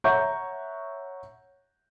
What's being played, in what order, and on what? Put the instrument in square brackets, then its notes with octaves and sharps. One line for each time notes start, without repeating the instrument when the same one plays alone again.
[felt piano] C#5 E5 F#5 A#5 C#6 G6